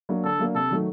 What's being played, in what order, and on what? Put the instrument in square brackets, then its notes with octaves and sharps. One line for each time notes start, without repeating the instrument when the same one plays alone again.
[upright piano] F#3 A#3 D4
[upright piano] D3 [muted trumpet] A4
[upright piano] F#3 A#3 D4
[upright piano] C3 [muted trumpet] A4
[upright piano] D#3 F#3 A3